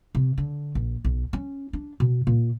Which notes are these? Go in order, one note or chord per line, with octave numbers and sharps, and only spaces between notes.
C3
D3
A#1
B1
C#4
D4
B2
A#2